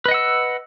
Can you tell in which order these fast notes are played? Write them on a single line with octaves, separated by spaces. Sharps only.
B4 D#5 F#5 E6